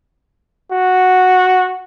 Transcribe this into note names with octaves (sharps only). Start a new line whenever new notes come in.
F#4